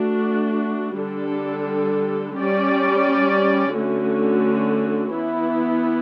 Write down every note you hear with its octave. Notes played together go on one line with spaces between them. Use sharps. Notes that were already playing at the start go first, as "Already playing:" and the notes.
Already playing: A3 D4 F#4
D3 G3 D4 A4
G3 C#4 G4 D5
D3 A3 C#4 F#4
E3 B3 E4